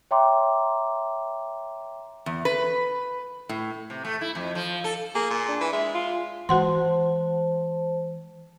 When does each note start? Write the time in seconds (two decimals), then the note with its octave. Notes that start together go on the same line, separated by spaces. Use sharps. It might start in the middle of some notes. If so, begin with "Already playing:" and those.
0.11 C#5 E5 G5 A#5 C6 D6
2.26 E2
2.45 B4
3.49 A2
3.90 C3
4.04 A3
4.21 E4
4.35 F2
4.55 F3
4.84 A4
5.15 A#3 G#4
5.30 A#2
5.49 D4
5.61 E3
5.73 G#3 E5
5.94 F4
6.49 E3 G#3 F#4 C5 F#5 A5 C6